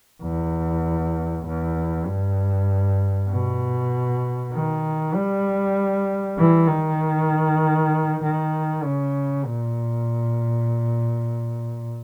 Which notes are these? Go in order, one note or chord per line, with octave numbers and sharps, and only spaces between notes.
E2
E2
G2
B2
D#3
G3
E3
D#3
D#3
C#3
A#2